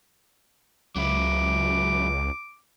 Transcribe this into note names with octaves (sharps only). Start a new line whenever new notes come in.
C#2 F#3 E4 D6